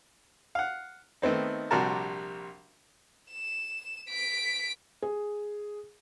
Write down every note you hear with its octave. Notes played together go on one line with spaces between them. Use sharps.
F5 F#5
D#3 A3 B3 C4 D#4
A#1 C3 G3 F#4 A#4 A5
E7
B6 D7
G#4